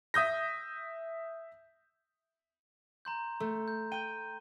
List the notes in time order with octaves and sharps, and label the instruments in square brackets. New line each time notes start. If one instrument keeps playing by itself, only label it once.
[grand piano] E5 D#6 G6 A#6
[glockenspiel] A#5 C6 G6
[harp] A3
[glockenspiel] G6
[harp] G5 G6 [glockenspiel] D#7